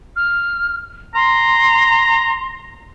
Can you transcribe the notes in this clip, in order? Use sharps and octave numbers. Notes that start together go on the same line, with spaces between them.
F6
A#5 C6